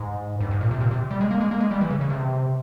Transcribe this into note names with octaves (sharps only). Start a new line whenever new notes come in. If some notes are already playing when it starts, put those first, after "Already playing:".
Already playing: G#2
G2
G#2
A#2
C3
A#2
C3
G3
G#3
A#3
G#3
A#3
G#3
G3
E3
C#3
C#3
C3